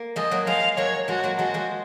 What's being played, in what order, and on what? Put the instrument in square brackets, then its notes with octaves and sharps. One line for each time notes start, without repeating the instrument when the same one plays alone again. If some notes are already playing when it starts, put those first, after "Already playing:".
Already playing: [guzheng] A#3
[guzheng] F3 G#3 [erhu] D#5
[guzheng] F#3 A#3
[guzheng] F3 G#3 [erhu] F5
[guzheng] F#3 A#3 [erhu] C#5
[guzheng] F3 G#3 [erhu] F#4
[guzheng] F#3 A#3
[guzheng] F3 G#3 [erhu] F#4
[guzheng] F3 G#3